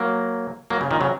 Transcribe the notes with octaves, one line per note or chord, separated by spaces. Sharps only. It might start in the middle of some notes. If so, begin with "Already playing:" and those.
Already playing: F#3 A#3
F#3 A#3
C#3
A#2 D#3
C#3 F#3